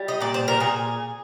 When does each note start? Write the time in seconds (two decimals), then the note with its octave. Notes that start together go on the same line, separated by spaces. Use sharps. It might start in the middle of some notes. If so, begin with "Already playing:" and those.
Already playing: G3
0.08 D#5
0.20 A#2 D5
0.34 C5
0.48 A#4
0.60 A#2 G#4